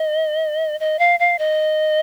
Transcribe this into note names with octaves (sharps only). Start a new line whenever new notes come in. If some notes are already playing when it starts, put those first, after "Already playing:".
Already playing: D#5
D#5
F5
F5
D#5